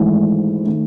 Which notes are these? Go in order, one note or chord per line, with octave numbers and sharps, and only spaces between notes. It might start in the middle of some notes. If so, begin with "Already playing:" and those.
Already playing: G#1 G#2 E3 A3
D#3 A3